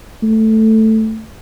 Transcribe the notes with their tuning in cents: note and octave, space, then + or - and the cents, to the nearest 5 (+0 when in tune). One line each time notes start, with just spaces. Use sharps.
A3 +0